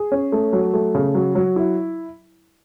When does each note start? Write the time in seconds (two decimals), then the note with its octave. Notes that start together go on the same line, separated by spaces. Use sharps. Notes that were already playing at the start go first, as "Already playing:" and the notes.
Already playing: G#4
0.12 C#4
0.32 A3
0.53 F#3
0.74 A3
0.95 C#3
1.15 F#3
1.35 F#3
1.56 E4